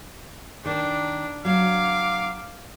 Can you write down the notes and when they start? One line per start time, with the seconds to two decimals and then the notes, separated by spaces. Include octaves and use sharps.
0.65 D#3 D4
1.45 F#3 D4 F5 D6